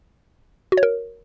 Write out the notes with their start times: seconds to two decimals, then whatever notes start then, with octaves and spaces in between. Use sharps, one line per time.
0.72 F#4
0.77 C#5
0.83 A#4